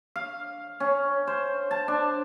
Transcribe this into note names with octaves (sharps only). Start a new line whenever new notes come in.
F5
C#4
C5
A5
D4